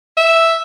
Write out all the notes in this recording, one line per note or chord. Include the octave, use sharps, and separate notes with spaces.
E5